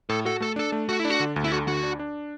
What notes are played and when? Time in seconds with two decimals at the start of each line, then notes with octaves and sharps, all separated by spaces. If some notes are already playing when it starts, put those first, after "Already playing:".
0.09 A2 A4
0.25 F#4 A4
0.41 A3 A4
0.56 D4 A4
0.72 A3
0.89 A3 F#4
0.99 E4
1.05 D4
1.10 F#4
1.20 D3
1.36 D2
1.44 E4
1.52 D3 F#4
1.67 D2 F#4
1.83 D4
1.99 D4